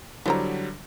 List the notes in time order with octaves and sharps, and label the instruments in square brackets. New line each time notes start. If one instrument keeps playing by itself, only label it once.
[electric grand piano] D3 F#3 G3 [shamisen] E4 C5 A#5